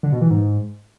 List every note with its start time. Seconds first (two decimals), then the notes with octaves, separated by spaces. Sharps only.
0.03 D3
0.12 B2
0.21 E3
0.30 G#2